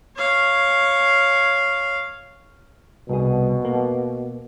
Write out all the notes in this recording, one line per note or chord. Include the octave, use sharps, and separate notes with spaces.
C#5 F5
C2 B2 G#4
A#3